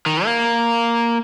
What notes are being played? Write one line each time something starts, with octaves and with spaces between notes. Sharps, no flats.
D#3
A#3